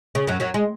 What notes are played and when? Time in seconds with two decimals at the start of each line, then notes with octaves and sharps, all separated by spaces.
0.15 C#3
0.27 F#2 F#3
0.40 F#2 F#3
0.54 G#3